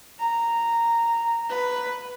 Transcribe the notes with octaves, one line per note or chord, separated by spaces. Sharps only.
A#5
B4